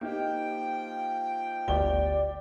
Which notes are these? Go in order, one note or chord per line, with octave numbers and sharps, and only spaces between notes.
F3 A#3 D#4 G4 G5
G1 D2 G4 D5 D6 G7